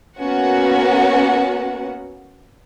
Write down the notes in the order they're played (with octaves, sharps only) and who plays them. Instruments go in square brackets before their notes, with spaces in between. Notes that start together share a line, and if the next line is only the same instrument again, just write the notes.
[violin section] A#3 B3 C#4 F#4 F#5